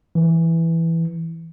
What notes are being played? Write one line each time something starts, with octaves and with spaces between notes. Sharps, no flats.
E3